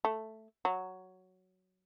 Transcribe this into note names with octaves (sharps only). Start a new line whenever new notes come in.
A3
F#3